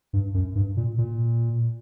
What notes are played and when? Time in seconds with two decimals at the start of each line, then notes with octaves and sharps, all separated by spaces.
0.13 G2
0.34 F#2
0.55 G2
0.77 A#2
0.98 A#2